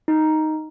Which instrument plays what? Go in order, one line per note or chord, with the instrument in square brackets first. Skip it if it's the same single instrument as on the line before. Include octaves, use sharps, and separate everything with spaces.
[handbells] D#4